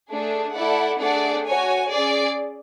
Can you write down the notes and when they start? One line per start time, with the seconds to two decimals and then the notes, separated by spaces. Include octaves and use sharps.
0.11 A3 D4 G#4
0.55 A3 E4 A4 D5 F#5
0.99 A3 D4 G#4 D5 F#5
1.45 F#4 C#5 G#5
1.89 C#4 G#4 D5